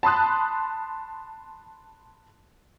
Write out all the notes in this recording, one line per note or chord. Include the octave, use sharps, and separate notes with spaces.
A5 B5 C6 D#6 F#6